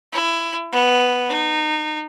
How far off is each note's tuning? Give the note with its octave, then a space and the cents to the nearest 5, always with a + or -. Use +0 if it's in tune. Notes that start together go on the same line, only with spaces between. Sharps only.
E4 +20
B3 +0
D#4 -25